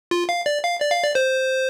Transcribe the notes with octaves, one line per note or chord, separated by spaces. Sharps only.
F4
F5
D5
F5
D5
F5
D5
C5